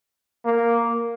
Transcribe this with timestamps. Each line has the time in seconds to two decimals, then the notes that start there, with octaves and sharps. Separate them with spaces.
0.45 A#3